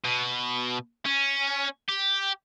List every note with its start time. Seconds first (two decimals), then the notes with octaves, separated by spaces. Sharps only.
0.05 B2
1.05 C#4
1.89 G4